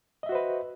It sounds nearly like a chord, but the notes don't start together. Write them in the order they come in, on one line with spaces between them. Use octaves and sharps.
D#5 E5 F#4 C5 B4